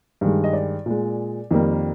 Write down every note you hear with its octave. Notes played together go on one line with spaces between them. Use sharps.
G2 D#3 G#3
D#5
D5
A#2 G#3
F2 D#3 G3 A#3